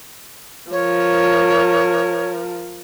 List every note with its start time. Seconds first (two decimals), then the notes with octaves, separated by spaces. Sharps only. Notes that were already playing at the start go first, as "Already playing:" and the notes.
0.71 F3 A#4 C#5